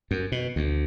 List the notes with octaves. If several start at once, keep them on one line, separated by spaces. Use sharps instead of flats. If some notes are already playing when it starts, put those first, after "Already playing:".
F#2
B2
D2